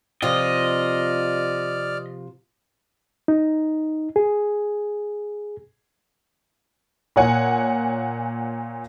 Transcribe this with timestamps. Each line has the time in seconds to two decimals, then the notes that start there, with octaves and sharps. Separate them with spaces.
0.22 C3 F3 F4 D5 D#5 F6
3.28 D#4
4.16 G#4
7.16 A#2 C#5 F#5 G#5